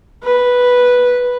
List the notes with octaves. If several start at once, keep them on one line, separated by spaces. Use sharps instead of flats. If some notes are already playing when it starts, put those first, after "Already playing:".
B4